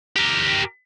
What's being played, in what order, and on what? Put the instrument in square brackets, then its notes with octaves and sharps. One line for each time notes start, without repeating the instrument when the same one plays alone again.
[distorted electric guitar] G4 A#4